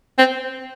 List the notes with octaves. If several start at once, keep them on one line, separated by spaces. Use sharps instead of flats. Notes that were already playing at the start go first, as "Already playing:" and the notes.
C4